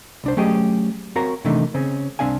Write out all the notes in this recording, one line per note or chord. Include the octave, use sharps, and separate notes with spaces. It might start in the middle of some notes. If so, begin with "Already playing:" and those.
C2 D4 C5
F#3 A3 C#4 G4 G#4 D#5
C4 F#4 A#4 C#5 F5 A#5
C3 D#3 E3 A3 D4 D#4
C#3 C4 C#4
C2 F3 C4 D4 F5 G#5